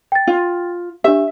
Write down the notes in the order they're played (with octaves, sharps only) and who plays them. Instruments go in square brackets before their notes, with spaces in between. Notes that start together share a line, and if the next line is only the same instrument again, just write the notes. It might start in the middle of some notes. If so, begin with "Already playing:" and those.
[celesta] G5 A6
[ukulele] F4
[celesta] D4 G4 [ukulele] E5